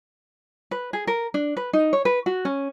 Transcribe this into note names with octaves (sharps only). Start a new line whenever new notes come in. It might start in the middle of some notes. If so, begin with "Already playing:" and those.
B4
G#4
A#4
D4
B4
D#4
C#5
B4
F#4
C#4